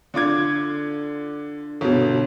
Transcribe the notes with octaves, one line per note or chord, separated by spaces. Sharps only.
D3 F4 D6 G#6
G1 B2